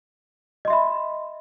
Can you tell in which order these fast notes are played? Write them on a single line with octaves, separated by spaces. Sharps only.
D#5 C6 E5 B5